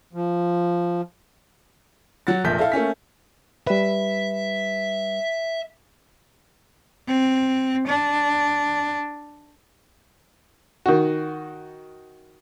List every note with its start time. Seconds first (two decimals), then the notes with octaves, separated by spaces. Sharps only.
0.13 F3
2.27 F#3 F#5 A6
2.44 F1 A#1 A#2 G6 B6
2.58 E4 A4 F5
2.72 A3 A#3 C#4 B6
3.67 G3 B4 E5
7.08 C4
7.88 D4
10.86 D#3 F#4